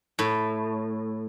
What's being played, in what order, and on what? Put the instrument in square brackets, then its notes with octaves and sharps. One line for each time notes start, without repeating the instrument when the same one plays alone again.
[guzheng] A2